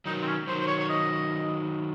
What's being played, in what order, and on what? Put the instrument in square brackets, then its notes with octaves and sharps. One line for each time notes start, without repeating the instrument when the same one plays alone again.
[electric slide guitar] D#3 F#3 [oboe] D#4
[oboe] C4
C#4
[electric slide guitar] D#3 F#3 [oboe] C5
[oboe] C5
C#5
C#5
D#5